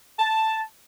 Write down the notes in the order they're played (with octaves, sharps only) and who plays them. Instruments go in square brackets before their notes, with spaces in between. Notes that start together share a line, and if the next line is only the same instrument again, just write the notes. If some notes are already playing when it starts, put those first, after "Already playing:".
[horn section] A5